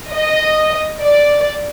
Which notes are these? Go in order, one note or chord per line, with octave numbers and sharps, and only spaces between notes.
D#5
D5